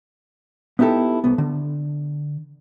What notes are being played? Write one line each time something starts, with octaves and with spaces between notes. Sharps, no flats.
B3 D#4 E4 G4 A4
C2 B3
D3